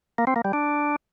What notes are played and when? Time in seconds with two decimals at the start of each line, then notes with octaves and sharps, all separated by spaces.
0.18 A#3
0.27 C4
0.36 A#3
0.45 G3
0.53 D4